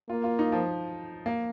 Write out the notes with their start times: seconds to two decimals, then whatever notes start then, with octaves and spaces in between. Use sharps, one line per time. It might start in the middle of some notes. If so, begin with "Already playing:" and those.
0.09 A#3 F4
0.24 F4
0.39 D#4
0.52 F3
1.26 A#3